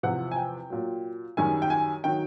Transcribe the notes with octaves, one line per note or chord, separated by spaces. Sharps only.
E2 C3 F3 F#5
G#5
G5
A#2 F#3
F#2 D#3 G3 G#5
G5
G#5
D#3 F#3 G5